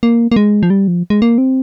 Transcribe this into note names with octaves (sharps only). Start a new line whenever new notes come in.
A#3
A#3
G#3
F3
G3
F3
G#3
A#3
C4